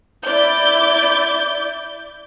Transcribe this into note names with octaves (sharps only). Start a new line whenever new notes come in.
E4 D5 G6